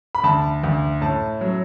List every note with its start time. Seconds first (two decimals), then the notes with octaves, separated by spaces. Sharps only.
0.15 B5
0.24 D2 A5
0.64 D2
1.01 A2 A5
1.41 F#3